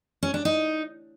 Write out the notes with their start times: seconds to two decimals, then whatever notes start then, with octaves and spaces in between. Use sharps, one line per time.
0.23 C#4
0.34 D4
0.45 D#4